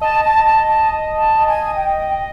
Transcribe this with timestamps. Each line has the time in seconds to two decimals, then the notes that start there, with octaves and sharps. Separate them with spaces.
0.01 D#5 A5
0.24 A5
0.45 A5
0.66 A5
1.17 A5
1.46 G#5
1.75 G5